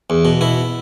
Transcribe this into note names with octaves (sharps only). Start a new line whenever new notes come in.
E2
B2
B2 E4